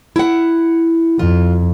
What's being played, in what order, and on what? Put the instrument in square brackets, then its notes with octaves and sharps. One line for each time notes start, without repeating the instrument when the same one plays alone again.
[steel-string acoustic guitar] E4 F#5
[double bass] F2 [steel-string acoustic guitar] F4